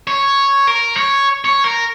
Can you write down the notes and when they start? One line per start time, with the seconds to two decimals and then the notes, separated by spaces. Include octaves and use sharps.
0.07 C#5
0.67 A#4
0.97 C#5
1.45 C#5
1.64 A#4